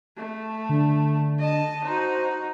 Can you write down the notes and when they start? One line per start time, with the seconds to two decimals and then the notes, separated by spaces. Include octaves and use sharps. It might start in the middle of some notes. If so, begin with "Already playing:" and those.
0.17 A3
0.69 D3
1.39 D#5 A5
1.85 D#4 F#4 C5